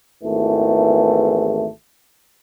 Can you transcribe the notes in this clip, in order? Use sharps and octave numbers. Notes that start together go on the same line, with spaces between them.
G#1 E2 E3 A3